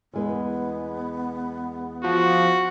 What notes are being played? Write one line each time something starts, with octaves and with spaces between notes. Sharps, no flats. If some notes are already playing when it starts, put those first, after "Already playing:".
E2 G#3 B3 B4
F3 F#4